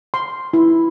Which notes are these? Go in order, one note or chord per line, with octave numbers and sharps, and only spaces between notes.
C6
E4